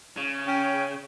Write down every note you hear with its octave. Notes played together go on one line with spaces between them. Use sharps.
C#3
C#4 G5